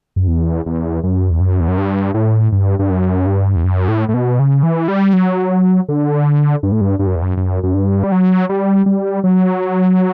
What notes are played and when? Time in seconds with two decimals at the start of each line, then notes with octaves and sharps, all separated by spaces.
0.16 F#2
0.28 E2
0.66 E2
1.04 F#2
1.31 E2
1.40 F#2
1.60 E2
1.68 F#2
1.78 G2
2.14 A2
2.52 G2
2.79 G2
2.90 F#2
3.26 G2
3.56 E2
3.64 F#2
3.88 A2
4.09 A2
4.14 B2
4.39 C#3
4.63 E3
4.88 G3
5.13 F#3
5.89 D3
6.63 G2
6.72 A2
6.81 G2
6.99 G2
7.07 F#2
7.16 E2
7.22 F#2
7.37 F#2
7.63 F#2
7.74 G2
8.04 G3
8.12 F#3
8.49 G3
8.86 G3
9.24 F#3